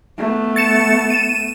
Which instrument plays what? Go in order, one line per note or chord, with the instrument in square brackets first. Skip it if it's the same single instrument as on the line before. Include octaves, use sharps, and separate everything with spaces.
[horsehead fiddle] A3 B3
[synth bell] A6 C#7 E7
D#7 E7